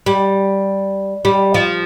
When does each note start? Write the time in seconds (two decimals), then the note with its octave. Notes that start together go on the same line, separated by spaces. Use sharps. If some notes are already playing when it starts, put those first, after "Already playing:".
0.06 G3
1.25 G3
1.54 F3